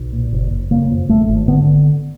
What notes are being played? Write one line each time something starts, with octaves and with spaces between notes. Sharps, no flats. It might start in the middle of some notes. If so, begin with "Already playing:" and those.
Already playing: B1
A#2
F#1
F#1
C#3 A#3
F2
G#1 A3
G#1
D3 B3